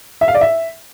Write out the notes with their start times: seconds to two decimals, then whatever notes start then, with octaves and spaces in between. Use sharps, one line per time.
0.21 E5
0.28 F5
0.35 D5
0.41 E5